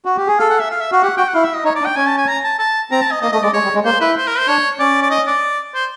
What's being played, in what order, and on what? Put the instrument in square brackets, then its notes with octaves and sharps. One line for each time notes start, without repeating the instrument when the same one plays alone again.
[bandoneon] F#4
G4
G#4
[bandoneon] A4 [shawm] F5
[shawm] F#5
E5
F5
E5
[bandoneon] F#4 [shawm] F5
[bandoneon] G4 [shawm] F#5
[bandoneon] F#4 [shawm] G5
[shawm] F#5
[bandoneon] E4 [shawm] F5
[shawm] E5
D#5
[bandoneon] D#4 [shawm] C#5
[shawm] D5
[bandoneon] D4
[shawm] G5
[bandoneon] C#4 [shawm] G#5
[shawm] A5
G#5
A#5
A5
A5
[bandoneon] C4 [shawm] A#5
[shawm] A5
D#5
[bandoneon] A#3 [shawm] D#5
[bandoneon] A3 [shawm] D#5
[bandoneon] G#3 [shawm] D5
[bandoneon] G#3 [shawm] C#5
[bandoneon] G3
G#3
[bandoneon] A#3 [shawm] C5
[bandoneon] E4 [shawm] B4
[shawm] C5
A#4
C5
[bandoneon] D4 [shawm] C#5
[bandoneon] C#4 [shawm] D5
[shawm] D5
D#5
D5
C5